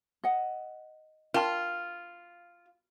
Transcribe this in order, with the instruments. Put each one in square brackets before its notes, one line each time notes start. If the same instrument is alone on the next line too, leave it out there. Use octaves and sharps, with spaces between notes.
[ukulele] D#5 F#5
[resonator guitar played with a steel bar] F4 [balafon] A#4 G5 A5